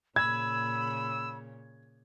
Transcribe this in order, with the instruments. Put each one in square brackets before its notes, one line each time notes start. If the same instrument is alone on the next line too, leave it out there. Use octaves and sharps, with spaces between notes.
[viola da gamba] A#2 C#3 [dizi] B5 [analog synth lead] E6 [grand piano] G#6